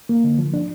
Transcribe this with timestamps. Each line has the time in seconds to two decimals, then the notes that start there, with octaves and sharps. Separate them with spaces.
0.09 A#3
0.24 D3
0.39 F3
0.54 D4